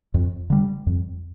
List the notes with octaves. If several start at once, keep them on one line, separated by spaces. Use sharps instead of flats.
F2
D3 G3
F2